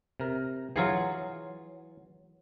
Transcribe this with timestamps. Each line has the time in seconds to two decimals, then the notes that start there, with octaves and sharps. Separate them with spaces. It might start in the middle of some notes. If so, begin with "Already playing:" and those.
0.20 C3 A#4
0.76 E3 F#3 F4 G#4